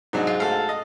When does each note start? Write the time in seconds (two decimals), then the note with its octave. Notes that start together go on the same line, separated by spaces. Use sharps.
0.13 G#2 F#3 D4 D#4
0.27 F4
0.40 A3 F#4 A4 F5
0.69 D#5